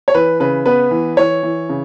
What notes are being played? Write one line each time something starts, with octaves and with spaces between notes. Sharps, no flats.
C#5
E3 B4
C#3 B4
B3 B4
E3
E3 C#5
E3
C#3